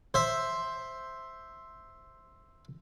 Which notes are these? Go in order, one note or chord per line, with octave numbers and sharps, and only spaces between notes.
C5 E5